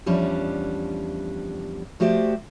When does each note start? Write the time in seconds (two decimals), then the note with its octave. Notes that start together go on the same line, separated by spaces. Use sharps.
0.06 E2 F3 G3 C#4 D4
2.00 F3 A3 F#4 G4 C5 D5